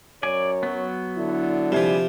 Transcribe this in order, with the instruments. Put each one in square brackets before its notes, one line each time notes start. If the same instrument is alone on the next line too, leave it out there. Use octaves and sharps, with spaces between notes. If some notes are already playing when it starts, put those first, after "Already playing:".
[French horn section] F#2 C#5 [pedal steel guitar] D5 G#5
[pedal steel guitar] F#3 B3
[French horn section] D3 E4
[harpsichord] C3 F3 [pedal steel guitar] G3 G#4 B4